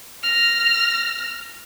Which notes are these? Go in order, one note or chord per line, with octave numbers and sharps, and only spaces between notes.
F6 A#6